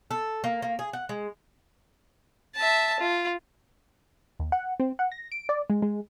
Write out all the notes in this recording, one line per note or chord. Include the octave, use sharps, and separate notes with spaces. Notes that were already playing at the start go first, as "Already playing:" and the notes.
A4
A#3
A#3
G#4
F#5
G#3
E5 A5
F4
D#2
F#5
C4
F#5
A#6
D7
D5
G#3
G#3